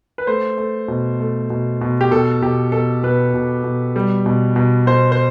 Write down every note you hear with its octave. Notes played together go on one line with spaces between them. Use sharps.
B4
A3 C5
A3
B2
A3
B2
B2
G4
B2 A4
B2 G4
B2 A4
B2 B4
B2
B2
G3
B2
B2
B2 C5
C5